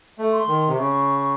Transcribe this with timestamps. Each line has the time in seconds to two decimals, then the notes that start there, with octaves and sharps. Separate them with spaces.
0.18 A3
0.33 C6
0.48 D#3
0.67 C3
0.77 C#3 C#6